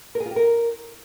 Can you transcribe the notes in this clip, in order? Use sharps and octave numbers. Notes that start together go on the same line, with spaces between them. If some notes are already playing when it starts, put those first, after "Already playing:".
A#4
G#4
F4
G4
A#4